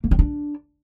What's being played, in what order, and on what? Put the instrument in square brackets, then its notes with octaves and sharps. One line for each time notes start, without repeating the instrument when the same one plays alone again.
[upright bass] A#3
C4
D4